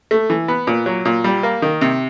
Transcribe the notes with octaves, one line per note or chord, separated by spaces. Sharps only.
A3
E3
B3
A#2
F#3
A#2
G3
A#3
D#3
C3